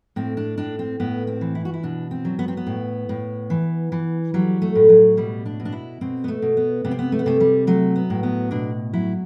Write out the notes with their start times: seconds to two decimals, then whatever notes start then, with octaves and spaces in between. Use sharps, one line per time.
0.16 A2 C4
0.37 D4
0.58 A2 D4
0.79 C4
1.00 A2 B3
1.27 C4
1.41 E3
1.55 E4
1.65 F#4
1.74 E4
1.83 B2 D4
2.11 C4
2.25 F#3
2.39 B3
2.48 C4
2.57 B3
2.67 A2
3.09 A2
3.50 E3
3.92 E3
4.34 F#3 G3
4.62 A3
4.75 A2
4.89 F#3
5.17 B2 G3
5.46 D4
5.60 B2
5.65 D4
5.72 E4
6.01 B2 C4
6.24 B3
6.28 A3
6.42 B2
6.57 B3
6.85 C3 B3
6.91 C4
6.99 B3
7.12 A3
7.19 B3
7.26 C3 A3
7.40 G3
7.67 F#3 A3
7.96 B3
8.10 A2
8.23 B3
8.51 B2 D4
8.93 F#3 E4